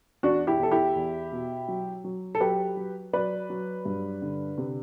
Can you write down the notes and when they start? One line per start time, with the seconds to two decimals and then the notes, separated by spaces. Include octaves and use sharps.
0.23 E2 D4 F#4
0.47 E4 G4
0.59 E2 A4
0.71 E4 G4
0.95 E2
1.32 B2
1.68 F#3
2.04 F#3
2.35 A4
2.40 F#3 G4 B4
2.77 F#3
3.13 F#3 B4 D5
3.50 F#3
3.85 G2
4.22 D3
4.58 C3